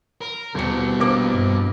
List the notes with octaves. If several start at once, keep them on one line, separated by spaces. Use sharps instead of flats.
A#4
D#1 B2 G3 C4 C#7
A#1 A#3 D6
G2